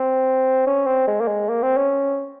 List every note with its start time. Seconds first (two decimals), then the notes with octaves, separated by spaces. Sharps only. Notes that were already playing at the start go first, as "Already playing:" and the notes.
Already playing: C4
0.67 C#4
0.86 C4
1.08 G#3
1.21 A#3
1.28 G#3
1.49 A#3
1.63 C4
1.77 C#4